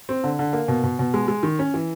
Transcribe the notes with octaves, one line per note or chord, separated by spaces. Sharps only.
C4
D3
D3
A#3
B2
B2
B2
G#3
G#3
D#3
C#4
E3